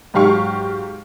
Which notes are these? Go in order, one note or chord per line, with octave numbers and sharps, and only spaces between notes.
G#2 F#3 G4 F5 C#6 F6